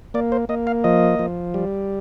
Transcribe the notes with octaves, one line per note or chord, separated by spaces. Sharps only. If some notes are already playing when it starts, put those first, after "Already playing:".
A#3 D5
C5
A#3 D#5
F5
F3 D#5
F3
G3